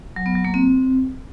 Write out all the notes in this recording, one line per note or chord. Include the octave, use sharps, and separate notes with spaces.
F#3
B3
F#3
A#3
C4